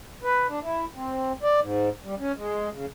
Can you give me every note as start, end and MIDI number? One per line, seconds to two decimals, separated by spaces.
0.24 0.47 71
0.49 0.59 62
0.63 0.85 64
0.96 1.32 60
1.43 1.60 74
1.60 1.89 44
2.04 2.15 55
2.19 2.32 61
2.37 2.69 56
2.72 2.86 49